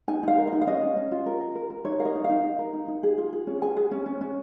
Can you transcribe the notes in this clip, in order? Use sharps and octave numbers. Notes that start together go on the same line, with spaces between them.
D#4 G#5
D#4 F5
A#4
D#5
D#4
F5
C#4 D#5
C#4
C#4
F4
A#4
A#4
A#4
A#4
D#4 C#5
A#4 F5
D#5
D#4
F5
D#4
D#4
A#4
D#4
D#4
G#4
F4
G#4
C#4
G#4 G#5
G#4
C#4
C#4
C#4